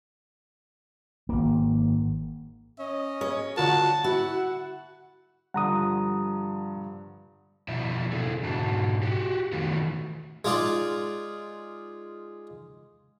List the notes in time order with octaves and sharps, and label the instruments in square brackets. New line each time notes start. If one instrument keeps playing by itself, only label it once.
[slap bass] G#1 A#3
[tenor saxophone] C#4 [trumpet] D#5
[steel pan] G#4 [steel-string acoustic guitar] C#5
[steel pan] D3 F4 A#4 [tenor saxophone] F#4 [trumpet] A5
[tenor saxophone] E4 [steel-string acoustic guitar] F#4 [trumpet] F#5
[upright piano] G2 D3 F3 [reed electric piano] F#5 A#5 D#6
[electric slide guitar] B2 F3 E4 D5 E5
E4 G#4 A4
G#2 B2 D3 F#4 A5
F#4 G4
D#3 E3 A3 B3 F4 F#4
[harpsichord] G#3 D#4 F4 D5